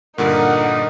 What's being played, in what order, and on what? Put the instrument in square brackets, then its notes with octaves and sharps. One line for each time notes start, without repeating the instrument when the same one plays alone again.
[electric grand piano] G2 A#2 D3 [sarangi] D#4 [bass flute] A#4 [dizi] F#5